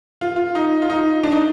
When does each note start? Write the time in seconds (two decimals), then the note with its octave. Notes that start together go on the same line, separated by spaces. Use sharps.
0.21 F4
0.36 F4
0.55 D#4
0.82 F4
0.90 D#4
1.23 D4
1.32 D#4